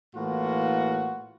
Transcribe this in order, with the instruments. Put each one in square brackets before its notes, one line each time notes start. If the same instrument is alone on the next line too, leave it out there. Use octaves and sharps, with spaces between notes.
[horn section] A2 E3 A#3 F4 F#4